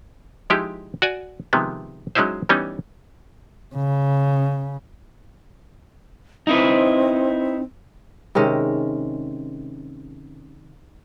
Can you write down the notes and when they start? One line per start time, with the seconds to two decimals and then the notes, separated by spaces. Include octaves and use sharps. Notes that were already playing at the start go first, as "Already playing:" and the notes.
0.50 F3 G#3 D#4 E4 G4
1.02 F#4 D5 G#5
1.53 C3 D#3 F3 G#3 B3
2.15 F#3 G#3 C#4 D#4 E4 C5
2.49 E3 G3 B3 C#4 D#4
3.75 C#3
6.47 C4 D#4 E4 B4
8.35 C3 D#3 G#3 C#4